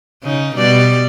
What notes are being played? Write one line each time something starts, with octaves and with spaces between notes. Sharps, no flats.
C#3 D#4
B2 G3 D5